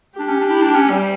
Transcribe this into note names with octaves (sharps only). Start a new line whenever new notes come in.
D4 G4
C#4
D4
E4
D4
C#4
G3